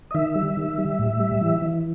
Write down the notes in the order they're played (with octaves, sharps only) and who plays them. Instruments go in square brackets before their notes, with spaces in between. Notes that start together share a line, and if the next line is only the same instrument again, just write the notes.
[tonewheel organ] D#5
D#3 E5
G3
D#3
G3
A2
G3
E3
E3